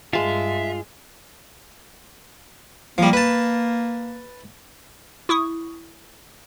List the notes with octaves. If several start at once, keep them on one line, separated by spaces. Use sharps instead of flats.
G2 G#3 F4 E5 A5
F3 G3 A#3
B4 A5
E4 C#6 D#6